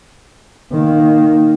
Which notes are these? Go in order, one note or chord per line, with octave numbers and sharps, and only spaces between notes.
D#3 A#3